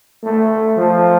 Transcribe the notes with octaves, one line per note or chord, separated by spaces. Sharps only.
A3
F3